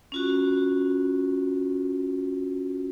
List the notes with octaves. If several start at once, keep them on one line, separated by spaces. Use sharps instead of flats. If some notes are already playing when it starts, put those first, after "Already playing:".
C#4 F4 F#4